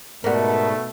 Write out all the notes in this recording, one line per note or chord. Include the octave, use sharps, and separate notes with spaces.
G#2 B2 G3 A3 A#4 F#5